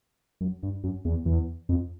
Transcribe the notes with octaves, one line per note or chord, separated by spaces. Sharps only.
F#2
G2
F#2
E2
E2
F2